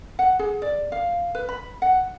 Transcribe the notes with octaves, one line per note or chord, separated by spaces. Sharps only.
F#5
G#4
D5
F5
B4
B5
F#5